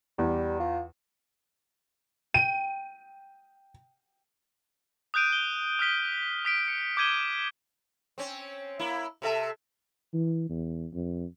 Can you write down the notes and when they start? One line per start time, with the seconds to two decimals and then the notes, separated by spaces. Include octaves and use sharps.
0.18 E2 G3
0.60 F4
2.34 G5 D#7
5.14 D#6 F#6 G6 D7 D#7
5.32 G7
5.79 D#6 F6 B6 G7
6.45 D#6 B6 D7
6.68 C#7
6.97 D6 G6 G#6 D#7 G7
8.18 C4 C#4
8.79 A#3 E4
9.22 C3 A4 E5
10.14 E3
10.49 E2
10.93 F2